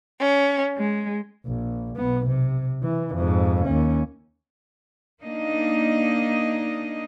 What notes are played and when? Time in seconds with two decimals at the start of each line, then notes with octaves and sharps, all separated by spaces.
0.20 C#4
0.78 G#3
1.46 A#1
1.96 B1 B3
2.27 C3
2.83 E3
3.15 F2 G#2
3.65 D#2 C#4
5.21 A#3 D4 D#4 D#5